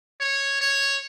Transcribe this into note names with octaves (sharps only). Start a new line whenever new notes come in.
C#5
C#5